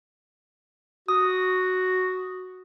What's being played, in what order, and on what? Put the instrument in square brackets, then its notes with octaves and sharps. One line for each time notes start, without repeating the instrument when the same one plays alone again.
[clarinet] F#4 [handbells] D#6